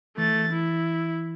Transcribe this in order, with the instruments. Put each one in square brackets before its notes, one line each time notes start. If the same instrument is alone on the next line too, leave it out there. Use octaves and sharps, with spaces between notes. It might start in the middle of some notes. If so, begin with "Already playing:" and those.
[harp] E3 [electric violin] A3 A6
[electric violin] E4